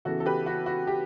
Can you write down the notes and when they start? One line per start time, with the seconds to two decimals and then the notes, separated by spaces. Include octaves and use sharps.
0.05 C#3 E3 B3 F#4 A4
0.20 A4
0.26 G4 B4
0.46 F#4
0.66 F#4
0.87 G4